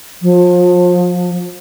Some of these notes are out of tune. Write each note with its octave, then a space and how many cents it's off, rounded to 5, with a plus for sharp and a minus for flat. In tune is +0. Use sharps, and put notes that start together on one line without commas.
F3 +30